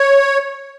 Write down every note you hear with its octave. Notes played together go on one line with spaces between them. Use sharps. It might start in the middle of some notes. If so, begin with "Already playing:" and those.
Already playing: C#5